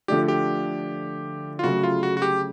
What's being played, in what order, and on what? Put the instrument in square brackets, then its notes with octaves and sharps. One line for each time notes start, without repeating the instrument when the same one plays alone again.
[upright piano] D3 F3 A3 D4 [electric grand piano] G4
[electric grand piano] G4
F4
[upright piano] C#3 F#3 A3 [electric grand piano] F#4
[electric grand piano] F4
F#4
F#4
G4